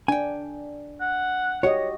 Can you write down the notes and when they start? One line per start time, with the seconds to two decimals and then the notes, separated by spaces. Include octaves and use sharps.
0.08 D4 G5 G#5
1.01 F#5
1.63 F#4 G4 C#5 D#5 F#5